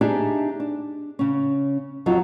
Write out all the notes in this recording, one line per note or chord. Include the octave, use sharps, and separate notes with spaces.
D4 D#4 G4 G#4 D5 E5
D4
C#3 C#4
F2 F#3 D#4 F4